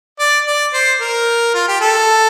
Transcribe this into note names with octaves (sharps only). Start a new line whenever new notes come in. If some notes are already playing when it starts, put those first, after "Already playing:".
D5
D5
C5
A#4
F4
G4
A4